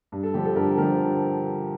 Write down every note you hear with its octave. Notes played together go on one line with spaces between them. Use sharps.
G2
A4
D3 F3 G4
A4
G2 G4 A#4
D3 F3 G4 A#4